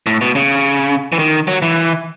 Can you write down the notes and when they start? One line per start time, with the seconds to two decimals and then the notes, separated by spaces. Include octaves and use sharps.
0.07 A2
0.21 B2
0.35 C#3
1.12 E3
1.19 D#3
1.48 F#3
1.62 E3